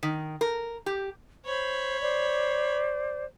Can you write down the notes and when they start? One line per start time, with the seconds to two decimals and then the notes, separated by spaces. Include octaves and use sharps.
0.03 D#3
0.41 A#4
0.86 G4
1.45 C5 C#5 B5
2.02 C5 D5